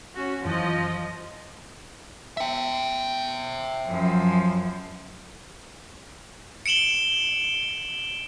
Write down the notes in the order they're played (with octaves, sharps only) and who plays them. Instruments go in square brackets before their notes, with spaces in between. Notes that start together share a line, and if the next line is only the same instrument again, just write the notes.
[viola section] C#4 F#4
[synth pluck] F#2 E3 [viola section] F3 D#5
[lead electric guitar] E5 G5
[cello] F#2 F3
[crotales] C#7 D7 E7 F#7 G7